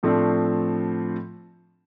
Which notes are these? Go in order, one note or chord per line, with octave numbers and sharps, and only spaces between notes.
A2 F3 A3 C4 D4